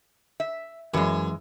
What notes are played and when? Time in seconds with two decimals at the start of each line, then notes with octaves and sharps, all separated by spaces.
0.40 E5
0.94 F#2 E3 G#3